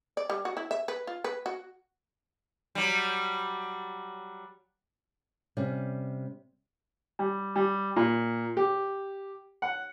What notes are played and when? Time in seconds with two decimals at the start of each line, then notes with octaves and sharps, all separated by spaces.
0.17 D5
0.30 G3
0.45 F#4
0.57 E4
0.71 E5
0.88 B4
1.07 F4
1.24 B4
1.46 F#4
2.75 F#3 G3
5.57 C3 G3 C#4
7.19 G3
7.56 G3
7.96 A#2
8.57 G4
9.62 F#5